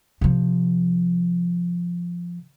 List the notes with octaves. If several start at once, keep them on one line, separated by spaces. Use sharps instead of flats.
C3 F3